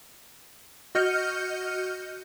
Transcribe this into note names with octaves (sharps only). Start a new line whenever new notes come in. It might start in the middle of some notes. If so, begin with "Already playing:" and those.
F#4 D#5 F6 G6 C#7